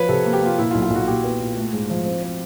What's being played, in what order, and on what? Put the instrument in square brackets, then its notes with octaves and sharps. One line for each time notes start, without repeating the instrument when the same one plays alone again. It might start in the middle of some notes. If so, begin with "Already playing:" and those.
Already playing: [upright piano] F3 [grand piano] B4 C#5
[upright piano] C3 [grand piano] A4
[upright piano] A#3
[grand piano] G4
[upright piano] A#3 [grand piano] F4
[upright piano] A#2 [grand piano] E4
[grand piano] F4
[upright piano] B1
[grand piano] F4
[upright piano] B1 [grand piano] F#4
[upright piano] A#2 [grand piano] G4
[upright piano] B3
A#2
A3
G#2
F3
C4
C4